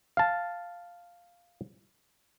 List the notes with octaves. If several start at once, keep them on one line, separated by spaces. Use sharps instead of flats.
F5 A5